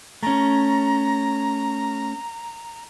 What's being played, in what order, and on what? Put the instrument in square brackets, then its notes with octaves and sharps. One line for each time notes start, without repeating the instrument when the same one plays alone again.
[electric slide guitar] A3 C#4 [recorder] A#5